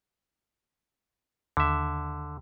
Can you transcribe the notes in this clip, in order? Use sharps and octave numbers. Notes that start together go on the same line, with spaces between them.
D#2 D3 E5